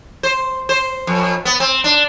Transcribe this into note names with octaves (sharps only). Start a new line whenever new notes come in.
C5
C5
F2
B3
C4
D4